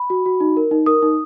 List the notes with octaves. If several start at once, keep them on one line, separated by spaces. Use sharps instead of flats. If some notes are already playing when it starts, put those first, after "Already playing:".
Already playing: B5
F#4
F#4
D#4
A#4
D#4
A#4 D#6
D#4